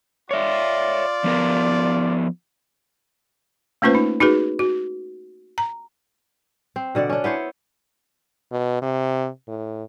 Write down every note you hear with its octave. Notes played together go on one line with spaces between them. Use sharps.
F4 C#5 D5 E5
F3 B3 A#4
A3 A#3 C#4 F4 B4 C5
D#4
D#4 F#4 G#4 B4
F#4
A#5
C4
B2 D3 D5 F#5
C#4 D4
B3 E4 C5 C#5
B2
C3
A2